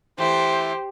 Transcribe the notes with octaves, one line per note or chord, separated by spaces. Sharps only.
E3 A3 E4 G4 C5